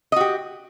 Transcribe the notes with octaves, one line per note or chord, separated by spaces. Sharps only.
F#4 G4 D#5